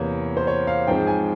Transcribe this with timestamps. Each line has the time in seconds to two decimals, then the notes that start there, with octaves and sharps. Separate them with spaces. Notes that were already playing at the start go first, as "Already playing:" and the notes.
Already playing: E2 C3 E3 A#3 C#5
0.37 C5
0.47 C#5
0.67 F5
0.87 G#2 F3 G#3 C4 G5
1.07 G#5